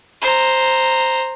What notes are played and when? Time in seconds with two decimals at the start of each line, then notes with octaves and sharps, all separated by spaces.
0.21 C5 A#5